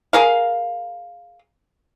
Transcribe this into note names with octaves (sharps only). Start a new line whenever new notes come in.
G#4 A#4 F5